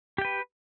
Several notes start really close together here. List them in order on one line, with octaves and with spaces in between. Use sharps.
G4 G5 B4